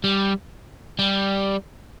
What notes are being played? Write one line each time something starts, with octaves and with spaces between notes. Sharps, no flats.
G3
G3